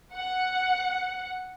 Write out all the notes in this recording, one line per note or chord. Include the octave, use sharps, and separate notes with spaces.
F#5